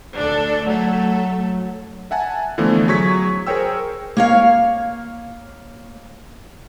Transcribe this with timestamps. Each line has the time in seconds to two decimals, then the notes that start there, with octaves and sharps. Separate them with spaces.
0.15 D2 D4 A4
0.66 F#3 A3 A4
2.11 E5 F#5 G#5 A5
2.58 D3 E3 F3 A3 B3
2.88 F#3 G#4 C#6 G#6 B6
3.47 G#4 A#4 C5 C#5 G5 E6
4.17 A#3 C#5 F5